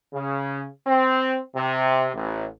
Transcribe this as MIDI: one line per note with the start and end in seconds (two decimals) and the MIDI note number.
0.14 0.66 49
0.87 1.39 60
1.56 2.09 48
2.14 2.46 33